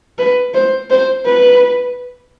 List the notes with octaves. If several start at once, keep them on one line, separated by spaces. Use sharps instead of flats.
B4
C5
C5
B4